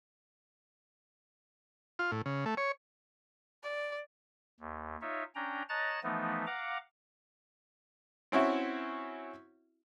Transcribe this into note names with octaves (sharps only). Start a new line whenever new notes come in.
F4
A2
C#3
A3
C#5
D5
D#2
D#4 F4 C#5 E5
C#4 D4 G5 A#5
C#5 D#5 A5 A#5 F#6 A6
E3 F3 A3 B3 D#4
F5 F#5 A#5 D6
C4 C#4 E4 F#4 E5